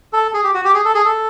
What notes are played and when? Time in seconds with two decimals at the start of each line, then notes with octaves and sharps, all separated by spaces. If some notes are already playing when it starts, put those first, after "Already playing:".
0.13 A4
0.34 G#4
0.44 G4
0.54 F#4
0.64 G4
0.74 G#4
0.85 A4
0.95 G#4
1.05 A4